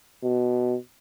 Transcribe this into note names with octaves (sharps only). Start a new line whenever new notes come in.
B2